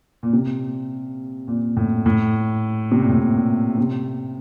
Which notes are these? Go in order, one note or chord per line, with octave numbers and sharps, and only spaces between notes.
A#2
C3
A#2
A2
A2
C3
A#2
A2
A#2
A#2
C3